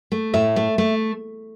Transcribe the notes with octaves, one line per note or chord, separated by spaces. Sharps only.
A3
A2 E5
A3
A3